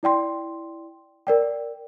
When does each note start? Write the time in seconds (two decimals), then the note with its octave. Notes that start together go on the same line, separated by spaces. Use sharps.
0.03 E4 D5 G5 C6
1.27 A#4 D5 G5